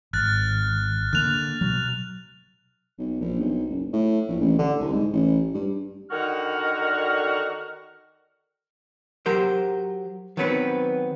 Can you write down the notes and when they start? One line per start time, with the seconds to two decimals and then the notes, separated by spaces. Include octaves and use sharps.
0.13 G#1 F6 F#6 A6
1.13 D3 A#3 F#6 F7
1.61 B2 F#3
2.98 B1
3.21 A#1
3.40 B1
3.69 F#1
3.93 A2
4.28 A#1
4.41 A1
4.58 D3
4.80 C2
4.93 G#2
5.13 A1
5.54 G2
6.11 D3 D#3 F#4 F6
9.26 F#3 G4 A#4 C5
10.37 D#3 F#3 B3 C4 A#4 B4